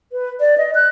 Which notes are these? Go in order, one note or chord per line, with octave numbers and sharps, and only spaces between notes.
B4
D5
D#5
F#6